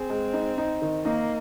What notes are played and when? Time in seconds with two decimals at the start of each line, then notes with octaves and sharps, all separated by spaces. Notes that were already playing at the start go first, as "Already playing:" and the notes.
Already playing: C4 G#4
0.10 G#3
0.33 D#4
0.58 D#4
0.82 D#3
1.05 A#3 D#4